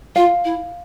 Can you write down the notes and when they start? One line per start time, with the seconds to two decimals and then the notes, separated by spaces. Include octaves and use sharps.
0.16 F4 F5
0.45 E4